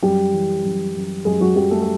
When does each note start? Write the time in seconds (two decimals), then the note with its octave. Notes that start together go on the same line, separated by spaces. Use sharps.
0.03 F#2 G3 G4
0.32 E3
0.64 F#2
0.94 F#2
1.25 F#2 G#3 G#4
1.41 F#3 F#4
1.56 F#2 G3 G4
1.71 A3 A4
1.82 A4